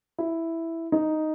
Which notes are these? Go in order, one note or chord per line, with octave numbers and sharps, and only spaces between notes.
E4
D#4